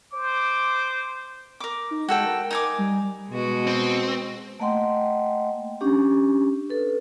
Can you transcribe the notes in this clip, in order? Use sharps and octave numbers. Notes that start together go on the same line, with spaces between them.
C5 D6
A#4 D6
D#4
G#3 F#4 A4 G5
A#4
D#4 G#5 D6
G3
B2 G#3 F#4
C4
A3 A#3 D#5 F#5 G5 C6
C#4 D4 G4
A4 B4